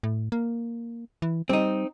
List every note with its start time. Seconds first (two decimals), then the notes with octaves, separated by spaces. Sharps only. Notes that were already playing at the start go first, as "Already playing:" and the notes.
0.03 A2
0.32 A#3
1.22 E3
1.49 G3 C4 D#4